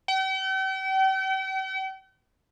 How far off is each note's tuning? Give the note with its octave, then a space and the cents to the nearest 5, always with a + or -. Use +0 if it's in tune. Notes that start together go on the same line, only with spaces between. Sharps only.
G5 -45